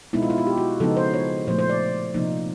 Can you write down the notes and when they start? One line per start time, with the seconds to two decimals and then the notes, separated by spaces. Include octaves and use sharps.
0.13 B2 G#3 B3 D#4 E4
0.22 F4
0.30 E4
0.38 F4
0.47 G4
0.57 F#4
0.80 C#3 F3 G#3 B3 D#4 A4
0.97 C5
1.14 C#5
1.47 A#2 F3 A3 C5
1.59 C5
1.69 D5
2.14 C3 F3 A#3 D#4